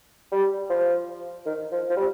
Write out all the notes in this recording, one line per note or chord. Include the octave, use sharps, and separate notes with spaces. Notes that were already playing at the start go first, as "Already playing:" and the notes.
G3
F3
D#3
F3
F3
G3